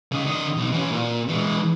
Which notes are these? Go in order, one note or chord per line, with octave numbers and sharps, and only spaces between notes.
C#3 D#5
D3 D#5
B1
E3 C#4
A#2
E3 G#3